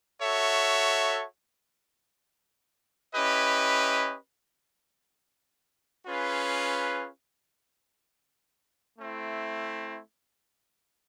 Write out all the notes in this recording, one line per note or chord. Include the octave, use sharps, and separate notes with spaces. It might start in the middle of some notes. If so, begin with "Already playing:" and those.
F#4 A4 C#5 E5
C#4 E4 G4 B4 D#5
C#4 F4 G#4 B4
A3 C4 E4